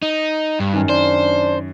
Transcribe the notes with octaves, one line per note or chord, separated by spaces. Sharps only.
D#4
G2
F#2 D#3
D4 C5